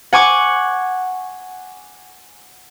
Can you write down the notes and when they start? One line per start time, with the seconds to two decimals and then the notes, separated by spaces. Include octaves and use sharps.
0.13 F#5 G#5 C#6 D6